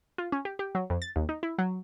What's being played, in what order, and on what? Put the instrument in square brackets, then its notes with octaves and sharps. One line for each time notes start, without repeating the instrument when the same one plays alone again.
[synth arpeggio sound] F4
C#4
G4
G4
F#3
F2
A6
D#2
D#4
E4
F#3